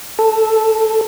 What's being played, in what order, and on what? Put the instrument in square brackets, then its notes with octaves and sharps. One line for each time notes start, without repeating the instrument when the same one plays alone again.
[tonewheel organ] A4